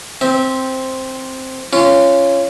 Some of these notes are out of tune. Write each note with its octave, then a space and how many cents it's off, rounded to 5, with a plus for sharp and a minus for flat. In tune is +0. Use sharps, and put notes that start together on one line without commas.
C4 +0 E5 -30
C#4 +0 F4 -25